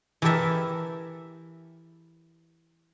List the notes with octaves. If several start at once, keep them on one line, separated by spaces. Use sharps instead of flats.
E3 E4 G4 A4 A#4 E5